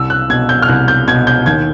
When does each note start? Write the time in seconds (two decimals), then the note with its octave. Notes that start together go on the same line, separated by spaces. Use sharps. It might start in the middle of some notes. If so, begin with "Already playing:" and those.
Already playing: C2 E6
0.10 F#6
0.29 B2 G#6
0.49 G6
0.62 F6
0.68 C2 F#6
0.88 G6
1.08 B2 G#6
1.27 G6
1.46 D#2 G#6